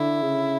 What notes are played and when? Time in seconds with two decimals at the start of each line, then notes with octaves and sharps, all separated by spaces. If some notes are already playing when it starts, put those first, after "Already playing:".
Already playing: D3 E4
0.22 C#3